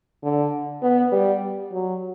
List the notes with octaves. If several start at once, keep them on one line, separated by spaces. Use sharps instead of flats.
D3
B3
G3
F#3